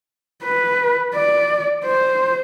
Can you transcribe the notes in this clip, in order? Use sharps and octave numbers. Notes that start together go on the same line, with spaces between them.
B4
D5
C5